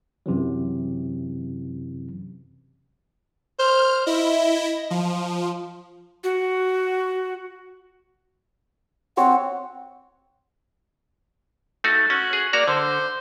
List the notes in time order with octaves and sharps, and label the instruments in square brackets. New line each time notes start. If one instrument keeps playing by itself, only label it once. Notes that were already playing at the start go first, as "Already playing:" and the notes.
[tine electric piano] F#2 C3 E3 F#3
[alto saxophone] C5 [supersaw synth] F6
[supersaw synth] E4 [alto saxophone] D#5
[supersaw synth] F3
[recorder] F#4
[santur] C4 C#5 E6 [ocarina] F#5
[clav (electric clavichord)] A3 D#4 F#4
[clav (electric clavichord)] C#4 [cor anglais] F#4
[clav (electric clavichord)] G#4
[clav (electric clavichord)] A#3 F#4 A#5 [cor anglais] D5
[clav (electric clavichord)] D3 [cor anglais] C5